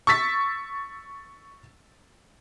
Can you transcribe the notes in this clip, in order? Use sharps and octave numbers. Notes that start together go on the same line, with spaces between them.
C#6 E6 A6 B6